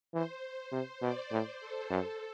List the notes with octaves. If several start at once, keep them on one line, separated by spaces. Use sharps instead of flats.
E3 C5
C3
B2 D5
A2 C5
A4
F#2 A4